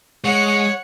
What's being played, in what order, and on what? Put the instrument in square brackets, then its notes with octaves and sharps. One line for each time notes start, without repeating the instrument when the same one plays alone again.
[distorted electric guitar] G#3 [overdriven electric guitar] C#5 [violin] F#5